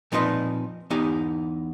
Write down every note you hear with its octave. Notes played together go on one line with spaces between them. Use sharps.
A#2 F3 C4 D#4 B4 D#5
E2 B3 D#4 G4 G#5